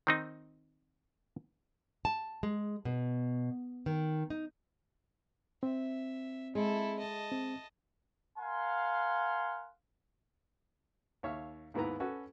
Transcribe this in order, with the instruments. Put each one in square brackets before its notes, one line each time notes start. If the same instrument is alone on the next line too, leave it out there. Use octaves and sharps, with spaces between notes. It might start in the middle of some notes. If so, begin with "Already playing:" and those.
[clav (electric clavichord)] D#3 C4 D#4
[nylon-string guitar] A5
G#3
B2
D#3
D#4
[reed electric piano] C4 [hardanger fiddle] E5
[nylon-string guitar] G#3 [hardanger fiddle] E4 A4
[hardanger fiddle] D#5 A5
[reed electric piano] C4
[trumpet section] A#4 F5 F#5 G#5 C6
[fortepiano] D#2 C#5 E5 F5
D#2 G#2 B3 E4 B4 A#5
C#4 F#4 A4 B4